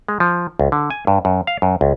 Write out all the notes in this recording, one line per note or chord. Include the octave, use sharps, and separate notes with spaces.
G#3
F3
C#2
D3
G#5
G2
F#2
F5
F#2
C#2